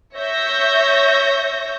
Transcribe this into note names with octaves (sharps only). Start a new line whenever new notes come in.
C#5 E5 C#6 G6 A#6